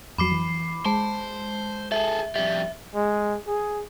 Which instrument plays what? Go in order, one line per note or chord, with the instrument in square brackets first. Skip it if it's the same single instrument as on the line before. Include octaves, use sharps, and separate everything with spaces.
[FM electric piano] F2 F#3 [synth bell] B5 D6 C7
[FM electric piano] E3
[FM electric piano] G#3 [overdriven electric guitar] C5 [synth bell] A5
[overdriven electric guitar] G#4 A4 [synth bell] E5
[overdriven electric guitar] F2 G3 [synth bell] E5
[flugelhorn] G#3
G#4